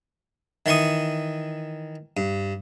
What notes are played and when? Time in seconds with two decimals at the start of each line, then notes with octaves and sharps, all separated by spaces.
0.66 D#3 E3 C6 C#6 D#6
2.17 G2